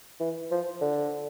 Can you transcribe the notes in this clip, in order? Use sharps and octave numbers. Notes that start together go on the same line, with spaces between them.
E3
F3
D3